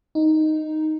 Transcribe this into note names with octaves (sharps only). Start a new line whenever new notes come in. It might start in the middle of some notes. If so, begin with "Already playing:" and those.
D#4